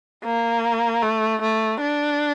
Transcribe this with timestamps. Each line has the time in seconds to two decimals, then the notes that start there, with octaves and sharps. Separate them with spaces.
0.24 A#3
1.02 A3
1.41 A3
1.81 D4